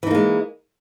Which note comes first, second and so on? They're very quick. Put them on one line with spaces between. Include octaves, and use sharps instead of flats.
E3 D#4 A#3 G#3